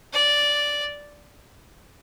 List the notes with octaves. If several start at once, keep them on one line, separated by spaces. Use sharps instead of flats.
D5